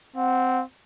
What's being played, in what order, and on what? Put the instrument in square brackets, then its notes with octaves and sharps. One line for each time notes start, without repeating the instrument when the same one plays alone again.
[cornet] C4 [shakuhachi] F#5